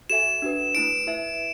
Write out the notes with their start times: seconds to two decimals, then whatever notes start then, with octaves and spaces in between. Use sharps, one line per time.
0.10 F#4 A4 E5 G#5 E7
0.42 D4 F#4 B4
0.75 A3 E4 B4 D7
1.07 E4 B4 E5